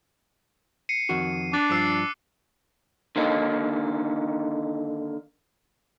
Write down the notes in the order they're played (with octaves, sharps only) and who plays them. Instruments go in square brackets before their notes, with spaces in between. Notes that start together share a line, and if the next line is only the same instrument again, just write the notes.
[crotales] C7 C#7 D#7
[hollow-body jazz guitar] F2 D#3 F#4
[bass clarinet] D4 [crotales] D6 F#6 A6
[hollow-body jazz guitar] G2 F3 [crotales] D6 E6 C7
[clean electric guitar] D3 D#3 A#3 D#4